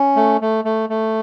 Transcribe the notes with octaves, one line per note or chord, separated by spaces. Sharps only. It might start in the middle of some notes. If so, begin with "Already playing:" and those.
Already playing: C#4
A3
A3
A3
A3